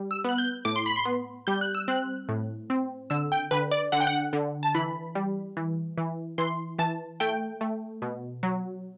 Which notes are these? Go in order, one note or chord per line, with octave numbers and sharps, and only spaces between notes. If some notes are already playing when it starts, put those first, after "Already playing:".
Already playing: G3
E6
B3 F#6
G6
A2 D6
C6
B5
C6
B3
G3 G6
F#6
E6
C4 F#6
A2
C4
D3 E6
G5
D3 B4
D5
D3 F#5
G5
F#5
D3
A5
E3 B5
G3
E3
E3
E3 C6
E3 A5
A3 G5
A3
B2
F#3